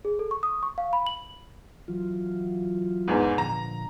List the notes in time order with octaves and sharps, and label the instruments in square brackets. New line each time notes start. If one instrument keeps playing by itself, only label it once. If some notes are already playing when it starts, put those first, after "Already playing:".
[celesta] G#4
A4
C#6
D#6
C#6
F5
B5
F#7
[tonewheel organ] E3 F#3 F4
[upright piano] E2 G#2
[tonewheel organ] A#2 D3 F3 [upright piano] A#5